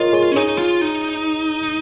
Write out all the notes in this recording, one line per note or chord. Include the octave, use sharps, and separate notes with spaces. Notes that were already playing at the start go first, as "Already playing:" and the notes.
Already playing: F4 G#4 A#4 C#5 D#5
G#4 C#5
C#4
D#4 G#4 C#5
F4
D#4